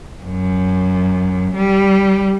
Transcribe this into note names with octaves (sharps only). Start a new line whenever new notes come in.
F#2
G3